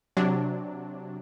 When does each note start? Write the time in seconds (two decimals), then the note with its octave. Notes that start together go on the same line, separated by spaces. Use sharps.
0.17 C3 F#3 D4